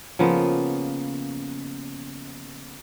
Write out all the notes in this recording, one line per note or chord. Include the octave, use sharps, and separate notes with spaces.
C#3 F3 A#3 B3